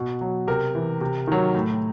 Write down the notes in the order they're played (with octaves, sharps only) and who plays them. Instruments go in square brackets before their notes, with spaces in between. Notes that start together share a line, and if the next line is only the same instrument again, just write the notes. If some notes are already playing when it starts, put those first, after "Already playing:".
Already playing: [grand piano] B2
F#3
C3 A#4
E3
C3
D#3 F#3
A2